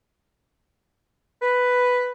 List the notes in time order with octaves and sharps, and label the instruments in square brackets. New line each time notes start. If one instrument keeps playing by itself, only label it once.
[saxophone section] B4